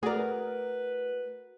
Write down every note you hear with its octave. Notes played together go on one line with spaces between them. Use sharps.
A3 F#4 G#4 A#4 B4 D5